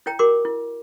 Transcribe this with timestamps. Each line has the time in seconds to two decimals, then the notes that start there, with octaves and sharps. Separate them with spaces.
0.06 E4 C#5 G5 A#5
0.19 F#4 A#4 C6 D6
0.45 E4